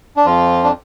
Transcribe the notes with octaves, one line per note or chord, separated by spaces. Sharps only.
D4
F2 F3 F4
D4